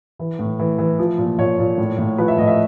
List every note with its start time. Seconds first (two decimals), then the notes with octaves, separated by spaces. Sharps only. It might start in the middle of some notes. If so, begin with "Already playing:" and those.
0.19 E3
0.39 A2
0.59 E3
0.78 E3
0.99 F3
1.18 A#2
1.38 A#2 C#5
1.59 A#2
1.78 A2
1.98 A2
2.18 F3 B4
2.28 E5
2.38 A2 D#5
2.47 E5